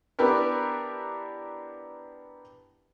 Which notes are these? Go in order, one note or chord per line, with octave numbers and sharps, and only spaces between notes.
B3 D4 E4 G4 A#4 B4